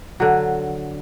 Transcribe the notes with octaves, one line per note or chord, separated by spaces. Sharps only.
D3 F#3